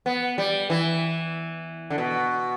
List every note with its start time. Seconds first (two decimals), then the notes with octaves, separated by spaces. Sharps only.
0.06 B3
0.38 G3
0.70 E3
1.90 D3
1.98 B2